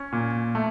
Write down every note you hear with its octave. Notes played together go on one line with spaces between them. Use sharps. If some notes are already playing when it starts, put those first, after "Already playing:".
Already playing: C#4
A#2
A3